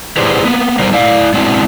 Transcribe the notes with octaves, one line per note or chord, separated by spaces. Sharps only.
E4 G4 G#4 B4 C5 D5
A#3 B3
G3 B3 D#4 A#4 C5 D5
E4 D5 F5
G#3 C4 D4 E4 F#4